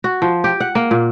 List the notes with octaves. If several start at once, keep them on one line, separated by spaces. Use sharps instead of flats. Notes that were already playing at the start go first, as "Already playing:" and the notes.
F#4
F3
G4
F#5
A#3
A#2